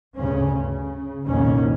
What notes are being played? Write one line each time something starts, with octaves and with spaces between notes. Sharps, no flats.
D2 G2 C#3 C#4
C#3
C2 F2 A#2 D#3 A#3 C#4